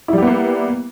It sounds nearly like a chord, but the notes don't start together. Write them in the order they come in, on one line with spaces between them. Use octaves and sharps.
E4 G3 G4 B3 A#3